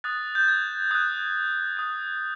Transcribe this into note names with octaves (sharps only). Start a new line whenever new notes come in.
D#6 F#6 A6
G6
G#6
D#6 F#6 G6
D#6 F#6